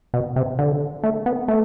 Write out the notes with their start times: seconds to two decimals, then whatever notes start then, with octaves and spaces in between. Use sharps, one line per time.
0.14 B2
0.36 C3
0.59 D3
1.03 A3
1.26 B3
1.48 A3